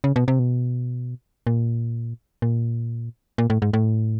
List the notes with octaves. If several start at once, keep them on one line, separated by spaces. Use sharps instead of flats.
C#3
B2
C3
B2
A#2
A#2
A#2
A2
G#2
A2